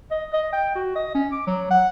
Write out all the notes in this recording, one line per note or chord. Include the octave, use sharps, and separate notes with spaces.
D#5
D#5
G5
F#4
D#5
C#4
D6
F#3
F#5